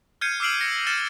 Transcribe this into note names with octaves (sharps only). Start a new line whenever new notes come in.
F6 G6 G#6 C7 C#7 D#7
D6 E6 F6 C7 D7 F#7
A#6 C#7
F6 A6 C#7 E7